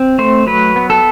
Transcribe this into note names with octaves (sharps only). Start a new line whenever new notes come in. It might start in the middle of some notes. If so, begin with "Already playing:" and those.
Already playing: C4
A3 C5
F#3 B4
B3
A4